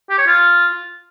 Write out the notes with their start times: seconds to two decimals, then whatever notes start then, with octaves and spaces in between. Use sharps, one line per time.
0.10 G4
0.18 C#5
0.27 F4